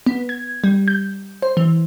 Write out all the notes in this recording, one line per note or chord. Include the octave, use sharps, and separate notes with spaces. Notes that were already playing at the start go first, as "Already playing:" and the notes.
B3
G#6
G3
G6
C5
E3